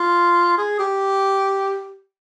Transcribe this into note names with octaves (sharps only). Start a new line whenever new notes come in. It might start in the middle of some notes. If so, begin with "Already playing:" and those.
Already playing: F4
G#4
G4